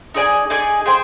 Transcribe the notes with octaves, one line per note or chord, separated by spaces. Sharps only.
D#4 G#4 D5 G#5
D#4 G#4 D5 G#5
G#4 C5 G5